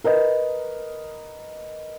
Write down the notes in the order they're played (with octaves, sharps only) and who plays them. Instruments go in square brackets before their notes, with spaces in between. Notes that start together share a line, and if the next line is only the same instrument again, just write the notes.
[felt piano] A#4 B4 D#5